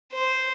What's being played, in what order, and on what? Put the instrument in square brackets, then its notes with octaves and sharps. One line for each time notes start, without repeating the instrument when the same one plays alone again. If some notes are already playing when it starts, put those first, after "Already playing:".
[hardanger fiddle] C5